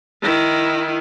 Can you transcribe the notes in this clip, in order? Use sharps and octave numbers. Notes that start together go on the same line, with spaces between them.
D#3 E4